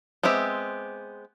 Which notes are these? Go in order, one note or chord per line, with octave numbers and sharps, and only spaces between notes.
G#3 B3 C4 G4 E5